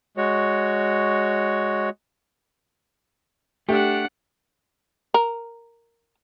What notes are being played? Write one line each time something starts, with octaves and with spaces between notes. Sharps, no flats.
G#3 F#4 C#5
A3 D4 G4 F#5
A#4